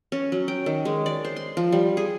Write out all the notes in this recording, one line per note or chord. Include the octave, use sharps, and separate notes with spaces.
C#4
F#3
G5
D#3
G#3
D5
C5
C6
F3
G3
G#4